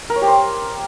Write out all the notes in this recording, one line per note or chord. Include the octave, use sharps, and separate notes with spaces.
A#4
C#5
G4
C5